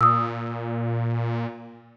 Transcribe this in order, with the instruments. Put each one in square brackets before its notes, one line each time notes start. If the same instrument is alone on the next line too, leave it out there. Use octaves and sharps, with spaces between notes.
[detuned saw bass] A#2 [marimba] D#6 E6